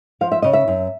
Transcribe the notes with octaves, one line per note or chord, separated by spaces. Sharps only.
F3 F5
E5
C#3 D#5
E5
F#2